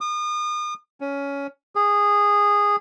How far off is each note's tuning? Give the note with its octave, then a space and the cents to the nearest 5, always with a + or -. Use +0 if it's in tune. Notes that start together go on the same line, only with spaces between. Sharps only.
D#6 -40
C#4 +15
G#4 -15